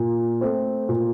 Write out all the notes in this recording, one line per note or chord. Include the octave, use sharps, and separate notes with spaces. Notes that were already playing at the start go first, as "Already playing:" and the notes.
Already playing: A#2
A3 C4
A#2